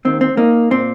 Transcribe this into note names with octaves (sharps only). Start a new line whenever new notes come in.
D#2 D#3 C4
C4
A#3 D#4
A#2 C4